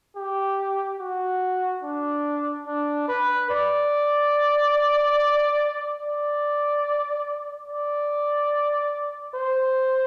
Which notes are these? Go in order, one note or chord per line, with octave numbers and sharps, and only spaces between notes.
G4
F#4
D4
D4
B4
D5
D5
D5
C5